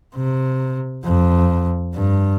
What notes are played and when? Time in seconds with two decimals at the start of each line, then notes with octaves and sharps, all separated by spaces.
0.15 C3
1.04 F2
1.94 G2